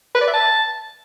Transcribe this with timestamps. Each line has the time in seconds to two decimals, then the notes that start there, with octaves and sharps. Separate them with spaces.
0.15 B4
0.21 D5
0.27 E5
0.34 A5